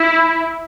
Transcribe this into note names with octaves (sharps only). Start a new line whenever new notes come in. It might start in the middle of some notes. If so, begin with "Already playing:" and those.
Already playing: E4